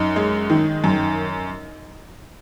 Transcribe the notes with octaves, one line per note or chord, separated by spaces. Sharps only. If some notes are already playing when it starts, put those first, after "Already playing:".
Already playing: F#2 D#4
G#3
D#3
F#2